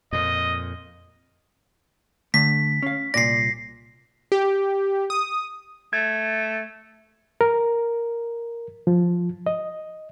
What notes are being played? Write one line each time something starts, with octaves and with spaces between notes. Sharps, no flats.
F2 A#2 D#5
D3 A3 B6
C#4 F5
C2 A#2 D5 A#6 C7
G4
D#6
A3 G#6
A#4
F3
D#5